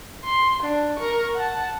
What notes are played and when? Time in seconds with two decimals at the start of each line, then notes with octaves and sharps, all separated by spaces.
0.25 C6
0.63 D4
0.97 A#4 C#6
1.35 F#5 A5